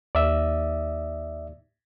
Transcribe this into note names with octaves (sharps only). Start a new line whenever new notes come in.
D#2 D5 E5